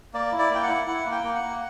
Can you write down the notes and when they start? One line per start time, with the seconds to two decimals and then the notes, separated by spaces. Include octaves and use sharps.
0.14 A#3 D5
0.32 E4
0.39 D5
0.50 A#3 G5
0.63 F#5
0.69 E4
0.87 E4 F#5
1.05 A#3
1.12 G5
1.23 A#3
1.35 F#5
1.42 A#3